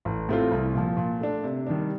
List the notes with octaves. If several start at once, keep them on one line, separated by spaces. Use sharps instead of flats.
A1
A2 A3 C4 F4
C2
A#2 F3
A#2
A3 D4
C3
D#3 G3 D4